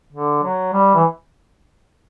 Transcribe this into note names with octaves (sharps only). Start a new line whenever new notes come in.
D3
F#3
G3
E3